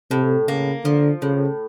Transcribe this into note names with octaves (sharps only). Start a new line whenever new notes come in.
A2 C3
C#3 A#3
D3 F3
A2 C#3